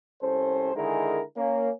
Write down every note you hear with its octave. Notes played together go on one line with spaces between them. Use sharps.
C2 C#4 A4 C5
D3 D#3 G#3 E4 G#4 A#4
A#3 C#4